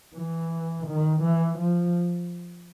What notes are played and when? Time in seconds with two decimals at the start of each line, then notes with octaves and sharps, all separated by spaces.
0.15 E3
0.86 D#3
1.22 E3
1.58 F3